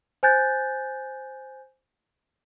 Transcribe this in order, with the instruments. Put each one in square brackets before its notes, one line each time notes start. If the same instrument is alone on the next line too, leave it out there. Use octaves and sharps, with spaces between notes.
[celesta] C5 G#5 F#6 G6 A6